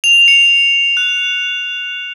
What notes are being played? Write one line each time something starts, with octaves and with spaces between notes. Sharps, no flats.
F7
C#7
F#6